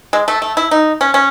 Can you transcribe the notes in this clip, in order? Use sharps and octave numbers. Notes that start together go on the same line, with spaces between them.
G#3
A3
A3
E4
D#4
C#4
C#4